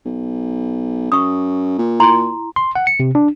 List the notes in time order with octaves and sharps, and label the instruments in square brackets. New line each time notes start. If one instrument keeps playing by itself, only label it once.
[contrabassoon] B1
[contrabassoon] F#2 [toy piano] C#6 D#6
[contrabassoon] A#2
[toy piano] E4 A#5 C6
[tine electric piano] C6
F#5
C#7
C3
D4